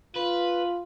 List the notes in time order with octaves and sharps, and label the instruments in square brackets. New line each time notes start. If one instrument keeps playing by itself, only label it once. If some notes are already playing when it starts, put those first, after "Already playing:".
[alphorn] F4 [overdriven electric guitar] B4